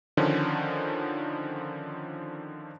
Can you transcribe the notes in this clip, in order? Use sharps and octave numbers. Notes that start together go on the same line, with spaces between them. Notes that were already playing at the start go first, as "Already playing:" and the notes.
D3 D#3 F3 C#4